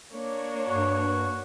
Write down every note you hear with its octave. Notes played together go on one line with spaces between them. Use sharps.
A#3 D4 C#5
G2 F#4